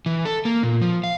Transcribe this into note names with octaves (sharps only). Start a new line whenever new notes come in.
E3
A4
A#3
A#2
F3
F5